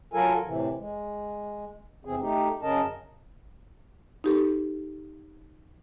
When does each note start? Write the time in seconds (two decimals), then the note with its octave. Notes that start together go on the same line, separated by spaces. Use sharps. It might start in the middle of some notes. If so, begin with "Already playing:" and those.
0.13 F#3 F4 A4 A#4 G#5
0.45 A2 C3 E3
0.77 G#3
2.05 E2 C3 E3 C4 G#4
2.21 A3 D#4 G4
2.62 F#2 C#3 C#4 A#4 D#5 A5
4.24 D#4 G4 A4